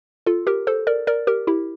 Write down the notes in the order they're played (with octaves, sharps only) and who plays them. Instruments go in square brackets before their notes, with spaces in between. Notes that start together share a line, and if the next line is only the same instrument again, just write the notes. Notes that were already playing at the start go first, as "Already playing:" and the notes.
[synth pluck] F4 A4
G4 A#4
A4 C5
A#4 D5
A#4 D5
G4 A#4
E4 G4